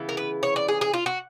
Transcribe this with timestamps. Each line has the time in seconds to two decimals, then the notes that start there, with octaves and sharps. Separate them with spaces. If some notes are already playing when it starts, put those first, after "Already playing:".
Already playing: C#3 E3 B3
0.09 A#4
0.17 B4
0.43 C#5
0.56 D5
0.68 G#4
0.81 G#4
0.94 F4
1.06 F#4